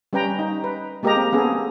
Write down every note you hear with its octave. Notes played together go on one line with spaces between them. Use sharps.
G3 C#4 B4 G5 A#5
D#4
B4
G#3 A#3 G4 A#4 D#5 A#5
C4
A#3 B3 C#4 G#4 A4